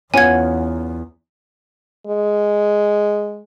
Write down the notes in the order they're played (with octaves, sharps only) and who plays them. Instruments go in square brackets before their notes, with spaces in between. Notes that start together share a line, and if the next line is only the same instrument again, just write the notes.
[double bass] E2 [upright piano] B3 C#4 F4 [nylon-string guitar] C#5 F#5 [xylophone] G#5 G#6
[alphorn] G#3